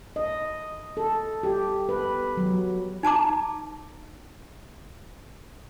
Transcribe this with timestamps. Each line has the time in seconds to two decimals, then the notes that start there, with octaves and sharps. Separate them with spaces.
0.16 D#5
0.97 A4
1.43 G4
1.89 B4
2.37 F#3
3.03 D#4 A5 A#5 D6